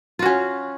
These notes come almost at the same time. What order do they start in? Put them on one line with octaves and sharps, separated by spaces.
F4 F#4 C#4